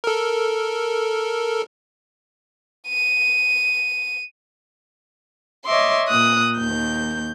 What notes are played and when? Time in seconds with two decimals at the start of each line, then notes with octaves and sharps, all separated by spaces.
0.04 A4 A#4
2.88 D#7
5.65 C#5 D#5 E5 C6 D6
6.08 A#2 D#6 F#6
6.57 D#2 G6